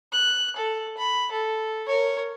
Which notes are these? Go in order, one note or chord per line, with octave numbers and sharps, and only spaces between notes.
F#6
A4
B5
A4
A#4 C#5